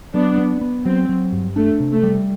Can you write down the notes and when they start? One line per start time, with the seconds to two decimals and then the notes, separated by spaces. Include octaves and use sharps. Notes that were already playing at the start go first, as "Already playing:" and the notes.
0.14 F#3 B3 D4
0.38 B3
0.61 B3
0.85 F#3 C4
1.09 F#3
1.32 G2
1.56 A3 D4
1.80 C3
1.92 A3
2.03 G3